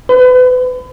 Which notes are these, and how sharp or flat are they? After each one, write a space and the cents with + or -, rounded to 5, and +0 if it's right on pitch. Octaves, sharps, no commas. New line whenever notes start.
B4 +35